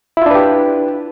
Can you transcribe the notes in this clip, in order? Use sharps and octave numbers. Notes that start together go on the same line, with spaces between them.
D4 E4 F4 G4 B4